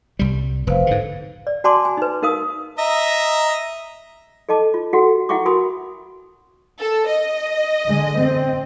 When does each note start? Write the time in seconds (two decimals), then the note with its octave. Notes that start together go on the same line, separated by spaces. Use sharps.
0.19 C2 G3
0.67 F1 B4 C5 F5
0.87 G#2 D3
1.47 D5
1.64 F#4 D5 G#5 A5 C6 D6
1.85 G#5
1.97 D#4 B4
2.23 D#4 A#4 F5 D#6
2.78 D#5 E5 A#5
4.49 A4 D#5 A5 D6
4.74 F4
4.93 F#4 G4 A4 F#5
5.29 E4 E5 F#5 G5 C#6 D6
5.46 F#4 A#4 G#5 B5 D#6
6.79 A4
7.08 D#5
7.88 D3 G#3
8.19 C4